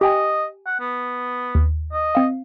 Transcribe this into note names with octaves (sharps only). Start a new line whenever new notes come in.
G4 D#5 G5 G#5
F#5
B3
D#2
D#5
C4 F5